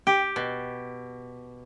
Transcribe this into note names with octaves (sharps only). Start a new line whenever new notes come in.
G4
B2